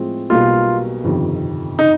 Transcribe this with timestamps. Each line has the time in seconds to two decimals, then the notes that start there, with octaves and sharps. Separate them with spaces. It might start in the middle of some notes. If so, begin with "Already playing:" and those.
Already playing: A2 F3 G#3 C4
0.30 B1 B2 G3 A#3 F4
1.04 G1 F2 C3 D#3
1.79 D#4